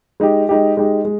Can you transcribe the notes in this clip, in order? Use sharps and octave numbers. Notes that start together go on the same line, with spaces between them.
G#3 D#4 G4
G#3 D#4 G4
G#3 D#4 G4
G#3